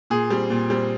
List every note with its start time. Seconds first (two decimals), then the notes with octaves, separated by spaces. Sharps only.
0.10 A#2 G#4
0.30 G3 C4
0.50 A#2
0.70 G3 C4